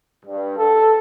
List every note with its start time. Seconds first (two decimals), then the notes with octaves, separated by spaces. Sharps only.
0.25 G2
0.57 A4